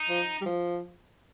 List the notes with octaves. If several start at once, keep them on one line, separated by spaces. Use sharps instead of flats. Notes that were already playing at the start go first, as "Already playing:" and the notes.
Already playing: D#4
F3
G3
F3